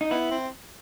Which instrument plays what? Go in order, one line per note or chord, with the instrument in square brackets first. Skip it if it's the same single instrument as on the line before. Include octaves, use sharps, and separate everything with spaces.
[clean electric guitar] D#4
[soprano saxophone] B3 [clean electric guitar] E4
[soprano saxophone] C4